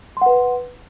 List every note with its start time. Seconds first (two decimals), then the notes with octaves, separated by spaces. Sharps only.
0.17 C6
0.21 F#5
0.26 B4